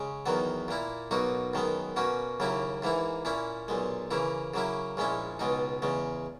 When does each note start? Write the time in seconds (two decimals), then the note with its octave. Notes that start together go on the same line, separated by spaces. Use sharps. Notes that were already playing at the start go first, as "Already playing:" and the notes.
Already playing: C#3 G#3
0.26 E2 D#3 F#3 B3
0.68 A#2 A#3 E4
1.11 B1 B2 A#3 D#4 F#4
1.54 F#2 D#3 G#3 B3
1.96 B2 A#3 C#4 F#4
2.40 D#2 C#3 F#3 A#3 E4
2.82 G#2 E3 A#3 E4
3.25 A#2 A#3 C#4 E4
3.68 B1 A#2 G#3
4.11 C#3 E3 A#3 E4
4.54 C#3 F#3 A#3 E4
4.97 A#1 A#2 G#3 C#4 E4
5.39 C#2 B2 G#3 D#4
5.82 E2 C#3 G#3